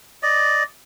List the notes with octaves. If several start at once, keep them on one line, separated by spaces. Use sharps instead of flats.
D5 D#5